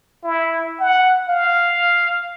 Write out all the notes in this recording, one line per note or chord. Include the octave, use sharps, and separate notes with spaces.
E4
F#5
F5